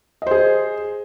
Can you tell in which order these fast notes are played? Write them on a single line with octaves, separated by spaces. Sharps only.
D#5 C5 G#4